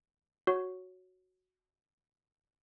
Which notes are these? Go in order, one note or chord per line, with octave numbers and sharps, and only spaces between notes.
F#4 C#5